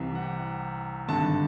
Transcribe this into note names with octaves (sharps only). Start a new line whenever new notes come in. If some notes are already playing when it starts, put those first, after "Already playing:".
Already playing: C2 C3 E3
F#5
G5
G#1 G2 D3 A5